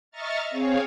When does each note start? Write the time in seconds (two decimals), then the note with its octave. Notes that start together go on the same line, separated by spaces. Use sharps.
0.11 D#5 E5 A#5 C#6 F6 A6
0.48 C4 G#4 C#5 F5